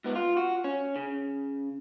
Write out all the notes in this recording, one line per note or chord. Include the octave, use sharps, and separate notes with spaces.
G#2 B3
F4
F#4
C#4
C#3